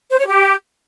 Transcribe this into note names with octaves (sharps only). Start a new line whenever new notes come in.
C5
C#5
G4